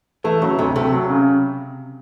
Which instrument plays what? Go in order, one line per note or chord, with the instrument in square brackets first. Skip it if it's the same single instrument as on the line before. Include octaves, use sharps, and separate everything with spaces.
[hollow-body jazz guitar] E3 [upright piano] A3
[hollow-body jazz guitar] C#3 [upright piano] F#3
[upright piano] D2 [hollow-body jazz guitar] C3
[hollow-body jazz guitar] C3 [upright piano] A3
[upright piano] F#3
C#3